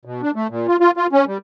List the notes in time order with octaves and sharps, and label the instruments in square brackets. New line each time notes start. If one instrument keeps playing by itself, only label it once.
[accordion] B2
D4
A3
A#2
F4
F4
F4
C#4
G3